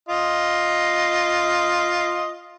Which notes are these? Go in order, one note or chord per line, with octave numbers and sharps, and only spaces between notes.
F4 D#5